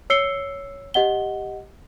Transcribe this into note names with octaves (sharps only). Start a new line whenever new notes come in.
C#5 E6 C7 C#7 G7
G4 D#5 F#5 G7